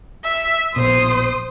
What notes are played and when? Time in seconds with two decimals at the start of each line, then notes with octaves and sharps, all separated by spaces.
0.24 E5
0.76 A#1 B2 C5 D#6